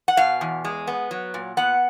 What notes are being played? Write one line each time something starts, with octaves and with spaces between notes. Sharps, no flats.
F#5
B2 F5
E2
G#3
B3
F#3
A#2
B3 F#5